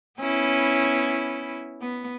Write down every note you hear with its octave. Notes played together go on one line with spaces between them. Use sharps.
B3 C#4 E4
B3